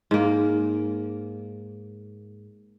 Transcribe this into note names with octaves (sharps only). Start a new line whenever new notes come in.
G#2 A#3